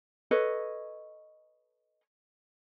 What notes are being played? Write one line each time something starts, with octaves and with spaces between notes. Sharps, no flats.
A4 B4 C#5 D#5